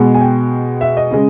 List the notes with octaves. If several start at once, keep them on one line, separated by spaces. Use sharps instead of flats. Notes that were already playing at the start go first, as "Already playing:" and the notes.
Already playing: B2 G#3 B3
G#5
G5
E5
D#5
C#3 G#3